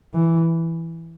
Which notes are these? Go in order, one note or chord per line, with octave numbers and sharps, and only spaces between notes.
E3